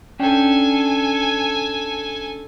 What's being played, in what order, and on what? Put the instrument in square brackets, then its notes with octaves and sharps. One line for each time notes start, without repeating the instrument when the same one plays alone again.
[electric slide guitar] C#4 D4 G5 [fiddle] A4 G#5